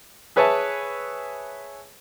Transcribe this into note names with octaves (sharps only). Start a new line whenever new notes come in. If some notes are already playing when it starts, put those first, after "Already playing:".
G#4 B4 C#5 E5 G#5 A5